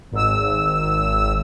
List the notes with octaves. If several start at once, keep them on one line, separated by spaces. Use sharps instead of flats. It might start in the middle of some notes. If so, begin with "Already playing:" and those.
G#1 E6